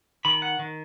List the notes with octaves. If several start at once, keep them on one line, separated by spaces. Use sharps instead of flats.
D#3 B5
F#5
D#3